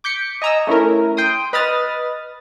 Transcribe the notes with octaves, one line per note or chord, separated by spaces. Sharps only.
D6 G6 B6 C#7
D#5 G#5 A#5 D#6 E6
A3 C#4 E4 A#4
G5 C6 D#6
B4 D#5 B5 D#6 F6 A6